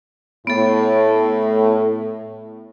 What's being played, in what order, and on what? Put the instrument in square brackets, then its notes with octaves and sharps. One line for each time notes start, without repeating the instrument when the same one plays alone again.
[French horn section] A2 [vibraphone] B3 A4